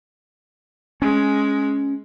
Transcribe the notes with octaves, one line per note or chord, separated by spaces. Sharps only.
G#3 C#4